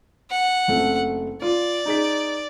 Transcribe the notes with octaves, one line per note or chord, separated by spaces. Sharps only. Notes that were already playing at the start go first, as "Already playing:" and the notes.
F#5
F#1 A3 C4
F4 D5
D#4 G#4 B6